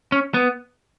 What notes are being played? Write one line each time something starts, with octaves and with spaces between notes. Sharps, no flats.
C#4
B3